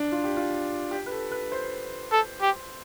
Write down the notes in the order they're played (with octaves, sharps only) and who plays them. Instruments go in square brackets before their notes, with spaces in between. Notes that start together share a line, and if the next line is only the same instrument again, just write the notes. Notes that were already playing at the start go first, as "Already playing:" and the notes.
Already playing: [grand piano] D4
F4
G4
F4
G4
B4
A4
B4
C5
[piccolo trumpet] A4
G4